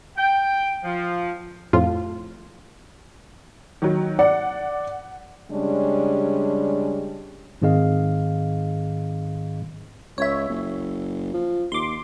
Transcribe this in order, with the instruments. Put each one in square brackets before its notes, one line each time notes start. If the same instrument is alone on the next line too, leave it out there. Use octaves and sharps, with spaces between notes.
[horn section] G5
F3
[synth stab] F2 A2 F4
[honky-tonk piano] D#3 F#3
[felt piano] D5 [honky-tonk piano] F#5
[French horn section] C#3 G3 G#3 C#4 D4
[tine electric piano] G#2 D#3 C4 G#4 D#5 F5
[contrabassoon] C#2 [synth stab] C#5 E5
[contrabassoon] F#1
F3
[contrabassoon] D#2 [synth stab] C6 D6